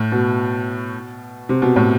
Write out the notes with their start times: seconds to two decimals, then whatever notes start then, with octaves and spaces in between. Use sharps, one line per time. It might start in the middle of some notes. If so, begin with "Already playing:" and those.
Already playing: A2
0.12 B2
1.49 C3
1.62 B2
1.76 A2